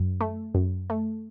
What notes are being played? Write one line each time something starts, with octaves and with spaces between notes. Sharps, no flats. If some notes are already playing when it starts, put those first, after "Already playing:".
Already playing: F#2
A3
F#2
A3